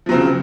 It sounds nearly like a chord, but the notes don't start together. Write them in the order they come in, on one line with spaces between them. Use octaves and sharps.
F3 F#3 C4 C#3